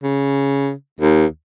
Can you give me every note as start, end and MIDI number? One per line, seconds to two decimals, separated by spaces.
0.03 0.72 49
1.01 1.26 39